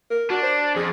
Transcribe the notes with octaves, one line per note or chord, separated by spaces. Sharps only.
A#4
D4 F#4
C5
F2 G#4